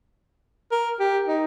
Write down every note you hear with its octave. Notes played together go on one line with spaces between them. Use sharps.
A#4
G4
D#4